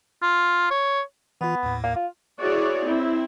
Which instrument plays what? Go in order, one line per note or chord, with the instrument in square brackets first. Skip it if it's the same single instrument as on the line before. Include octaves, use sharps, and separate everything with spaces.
[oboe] F4
C#5
[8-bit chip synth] E3 F4 [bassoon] B3
[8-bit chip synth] D#2 A2
[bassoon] A#3
F4
[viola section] E4 F#4 G#4 C#5 D5
C4 E4